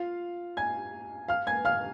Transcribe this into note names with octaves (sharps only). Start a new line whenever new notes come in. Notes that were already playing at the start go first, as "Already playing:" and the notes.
Already playing: F4 F5
G#5 G#6
F5 F6
G#5 G#6
F5 F6